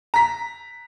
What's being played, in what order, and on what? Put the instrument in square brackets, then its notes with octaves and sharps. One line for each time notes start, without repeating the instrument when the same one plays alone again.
[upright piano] A#5 B6